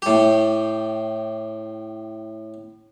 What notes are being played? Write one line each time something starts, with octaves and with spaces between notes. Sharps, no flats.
A2 G4